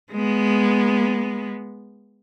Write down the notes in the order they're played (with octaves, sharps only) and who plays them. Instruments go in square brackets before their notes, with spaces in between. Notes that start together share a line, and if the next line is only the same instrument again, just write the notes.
[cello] G#3 B3